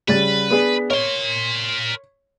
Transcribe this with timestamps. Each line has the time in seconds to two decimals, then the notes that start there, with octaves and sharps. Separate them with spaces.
0.08 C#3 G3 B4 A6
0.50 B3 D4 G#4
0.90 A#4 C#5 C6